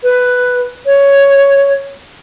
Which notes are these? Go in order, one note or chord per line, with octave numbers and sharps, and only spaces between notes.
B4
C#5